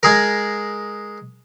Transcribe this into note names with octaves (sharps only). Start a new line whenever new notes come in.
G#3 G#4 A#4